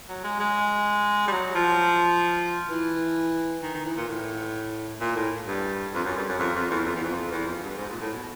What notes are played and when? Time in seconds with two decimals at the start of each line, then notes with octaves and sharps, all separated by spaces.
0.09 F#3
0.24 G#3
0.40 G#3
1.28 G3
1.32 F#3
1.55 F3
2.70 E3
3.63 D#3
3.74 D#3
3.86 E3
3.97 A#2
4.09 A2
5.00 A#2
5.16 A2
5.47 G2
5.94 F2
6.05 F#2
6.17 G2
6.28 F#2
6.39 F2
6.55 F2
6.70 E2
6.86 F2
6.95 E2
7.04 F2
7.31 E2
7.47 F2
7.63 G2
7.78 G#2
7.90 A#2
8.01 A2
8.13 B2